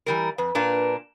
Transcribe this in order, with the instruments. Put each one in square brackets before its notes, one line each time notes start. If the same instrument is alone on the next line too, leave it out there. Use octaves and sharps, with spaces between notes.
[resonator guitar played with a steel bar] E3 G3 A#4
[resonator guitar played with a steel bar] F2 [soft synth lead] B4
[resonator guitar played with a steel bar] A#2 A#3 D4